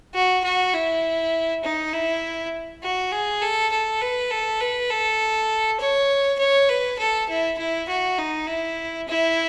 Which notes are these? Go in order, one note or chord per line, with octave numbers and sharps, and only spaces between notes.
F#4
F#4
E4
D#4
E4
F#4
G#4
A4
A4
B4
A4
B4
A4
C#5
C#5
B4
A4
E4
E4
F#4
D#4
E4
E4